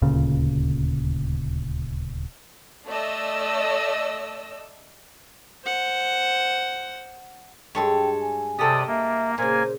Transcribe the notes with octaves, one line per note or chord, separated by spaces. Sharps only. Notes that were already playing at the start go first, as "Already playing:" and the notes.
D#1 D2 A#2 C#3
A3 D5 D#5 E6
C5 F#5
G2 G#3 A4 C#5 G5
G#5
C3 G4 A4 D5 D#5 D#6
A#3 E5
A#2 C#3 A#3 C5 G#5